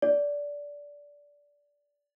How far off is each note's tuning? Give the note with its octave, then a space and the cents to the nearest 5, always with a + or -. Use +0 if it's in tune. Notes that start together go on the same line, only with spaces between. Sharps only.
D5 -15